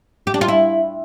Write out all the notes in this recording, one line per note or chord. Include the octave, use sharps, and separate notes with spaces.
G4
D4
F4
E4